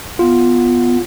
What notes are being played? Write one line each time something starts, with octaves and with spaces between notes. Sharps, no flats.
B3 F4